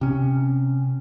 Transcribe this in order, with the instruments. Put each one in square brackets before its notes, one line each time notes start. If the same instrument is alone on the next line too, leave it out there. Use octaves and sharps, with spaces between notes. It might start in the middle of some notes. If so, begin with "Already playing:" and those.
[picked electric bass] C3 C#4